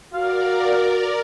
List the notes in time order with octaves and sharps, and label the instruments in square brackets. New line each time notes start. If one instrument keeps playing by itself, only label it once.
[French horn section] F#4 [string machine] A#4 D5 [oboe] F5